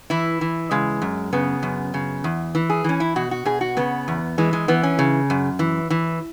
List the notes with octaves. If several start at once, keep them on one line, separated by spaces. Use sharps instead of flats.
E3 E4
E3
C#3 G#3
F#2
C#3 B3
F#2
C#3
E2
E3
G#4
E3 C#4
E4
B2 F#4
F#4
B2 G#4
F#4
C#3 B3
E2
E3 G#3
G#3
E3 B3
C#4
C#3
F#2
E3
E3